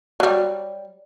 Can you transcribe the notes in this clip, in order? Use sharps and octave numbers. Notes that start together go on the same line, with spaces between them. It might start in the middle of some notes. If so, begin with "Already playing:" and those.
F#3 G3